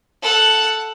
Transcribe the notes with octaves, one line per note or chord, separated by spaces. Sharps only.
A4 F#5